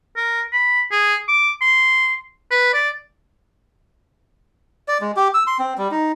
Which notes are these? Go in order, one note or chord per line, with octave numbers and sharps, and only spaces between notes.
A#4
B5
G#4
D6
C6
B4
D5
D5
G#3
G4
E6
C6
C4
G3
D#4